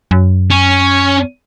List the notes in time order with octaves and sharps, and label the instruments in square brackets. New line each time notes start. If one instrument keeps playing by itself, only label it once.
[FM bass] F#2
[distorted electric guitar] C#4